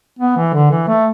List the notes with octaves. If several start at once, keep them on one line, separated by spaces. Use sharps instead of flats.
B3
E3
D3
E3
A3